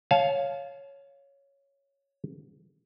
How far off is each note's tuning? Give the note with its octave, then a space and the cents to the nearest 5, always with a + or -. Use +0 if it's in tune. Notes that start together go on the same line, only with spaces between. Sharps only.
C#5 +0 F5 +0 A5 -30